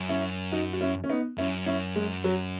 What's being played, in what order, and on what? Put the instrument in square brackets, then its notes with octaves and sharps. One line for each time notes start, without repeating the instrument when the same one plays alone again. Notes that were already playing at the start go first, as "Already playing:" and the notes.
Already playing: [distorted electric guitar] F#2
[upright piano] C#4 E4
D#4 F#4
F#4
C#4 E4
C#4
B3 D#4
[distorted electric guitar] F#2 [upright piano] C#4 E4
[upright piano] C#4 E4
G#3
F#3